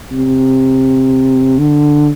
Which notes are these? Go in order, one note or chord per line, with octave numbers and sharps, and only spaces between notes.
C3
D3